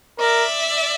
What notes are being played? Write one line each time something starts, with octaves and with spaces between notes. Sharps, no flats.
A#4 D5 E5